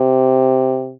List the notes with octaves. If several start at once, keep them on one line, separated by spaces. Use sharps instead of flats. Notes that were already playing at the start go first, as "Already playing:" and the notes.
Already playing: C3